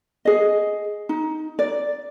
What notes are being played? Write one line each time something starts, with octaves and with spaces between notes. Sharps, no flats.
G#4 D#5
D#4
D5